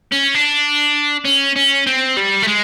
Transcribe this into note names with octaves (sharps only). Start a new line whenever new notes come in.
C#4
D4
C#4
C#4
C4
G3
A3
G#3